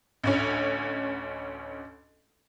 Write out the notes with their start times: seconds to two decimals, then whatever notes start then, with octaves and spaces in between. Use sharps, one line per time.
0.24 A1 D2 C#4